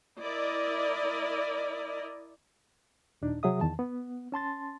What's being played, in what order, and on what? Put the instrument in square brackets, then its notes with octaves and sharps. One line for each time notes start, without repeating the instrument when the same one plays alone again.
[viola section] E4 A#4 D5 D#5
[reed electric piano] D#2 A#2 D4 D#4
C3 F#3 G#4 E5 D#6
E2 D#3 A5
B3
C#4 A5 C6 A6